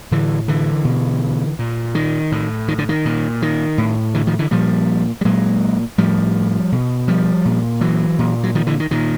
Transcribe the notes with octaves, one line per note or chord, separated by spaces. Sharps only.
A2 D3 E3
D3 E3
B2
A#2
D#3
A2
D#3
D3
D#3
A#2
D#3
A2
D3 E3
D#3 F3
D3 E3
A#2 F3 G3
G3
A#2 F#3 G#3
A2 F3 G3
B2
F3 G3
A#2
E3 F#3
A#2
F#3
D#3 F3
D3 E3
D#3
A#2 D#3